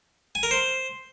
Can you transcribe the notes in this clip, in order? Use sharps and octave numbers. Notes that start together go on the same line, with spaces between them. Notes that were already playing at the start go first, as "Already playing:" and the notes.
G#5
A#4
C5